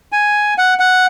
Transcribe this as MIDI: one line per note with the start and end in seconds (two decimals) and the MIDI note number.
0.12 0.54 80
0.58 0.74 78
0.79 1.06 78